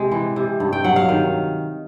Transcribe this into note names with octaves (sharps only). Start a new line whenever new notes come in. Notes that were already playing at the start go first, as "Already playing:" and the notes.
Already playing: C3 G#3
E3
C3
G2
G5
F#3 F#5
F5
D#3